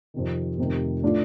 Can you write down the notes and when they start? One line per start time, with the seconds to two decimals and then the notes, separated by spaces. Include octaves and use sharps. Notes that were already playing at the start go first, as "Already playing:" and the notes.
0.14 F2 C3 D#3
0.58 F1 F2 C3 D#3
1.03 A2 A3 D4 F4